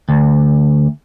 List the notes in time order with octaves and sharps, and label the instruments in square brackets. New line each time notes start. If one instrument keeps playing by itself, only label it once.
[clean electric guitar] D2